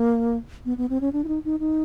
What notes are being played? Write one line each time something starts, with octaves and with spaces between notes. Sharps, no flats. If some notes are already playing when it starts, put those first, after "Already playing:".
Already playing: A#3
B3
B3
C4
C#4
D4
E4
D#4
D#4
D#4